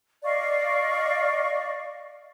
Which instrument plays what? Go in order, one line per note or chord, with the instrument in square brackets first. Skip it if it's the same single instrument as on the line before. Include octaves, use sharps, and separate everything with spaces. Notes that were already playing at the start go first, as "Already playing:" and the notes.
[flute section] D5 D#5 F5 C#6